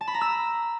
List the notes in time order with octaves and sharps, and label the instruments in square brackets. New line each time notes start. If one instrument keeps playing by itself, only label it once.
[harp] A5
B5
A#5
E6